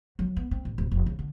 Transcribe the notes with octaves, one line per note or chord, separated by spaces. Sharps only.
F#3
B3
C4
A1
D1
F1
C#3
D3